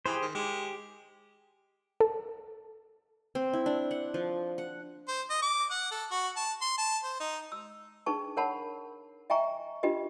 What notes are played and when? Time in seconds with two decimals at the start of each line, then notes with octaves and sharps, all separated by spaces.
0.06 E3 G4 G#4 C5
0.22 D#3
0.35 G#3 G4
2.00 A4
3.35 C4
3.53 E4
3.66 D4
3.91 F#5
4.14 F3
4.58 F#5
5.08 C5
5.30 D#5
5.42 D6
5.71 F#5
5.91 A4
6.11 F#4
6.36 A5
6.61 C6
6.78 A5
7.04 C5
7.20 D#4
7.52 E6
8.06 D4 D#4 G#4 B4 A5 C#6
8.37 A#4 C#5 F#5 A5 B5
9.30 D#5 E5 G5 G#5 A#5 C#6
9.83 D4 D#4 F4 G4 B4 D#5